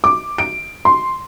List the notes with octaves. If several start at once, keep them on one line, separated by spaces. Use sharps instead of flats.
D6
D7
C6